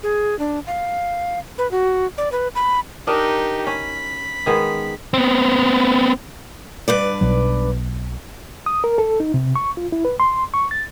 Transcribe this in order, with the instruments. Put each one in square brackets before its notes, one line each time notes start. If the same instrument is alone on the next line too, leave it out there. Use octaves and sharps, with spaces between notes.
[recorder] G#4
D4
F5
B4
F#4
D5
B4
B5
[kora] D4 A#4 D#5 [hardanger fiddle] D#4 G4
[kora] C#4 [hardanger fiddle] B5
[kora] D#3 G#3 B3
[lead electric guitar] B3 C4
[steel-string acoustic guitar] G2 B4 D5
[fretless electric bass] B1 B2 F#3
[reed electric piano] D#6
A#4
A4
D#4
C3
C#6
F4
E4
B4
C6
C#6
A6